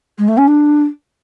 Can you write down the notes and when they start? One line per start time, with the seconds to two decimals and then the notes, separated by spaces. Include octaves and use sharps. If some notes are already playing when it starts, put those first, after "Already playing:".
0.18 G#3
0.28 A3
0.37 C#4
0.47 D4